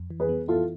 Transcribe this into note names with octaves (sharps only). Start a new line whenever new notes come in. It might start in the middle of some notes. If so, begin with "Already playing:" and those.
Already playing: F2
E3
G#4 B4
B3
E4 F4 A4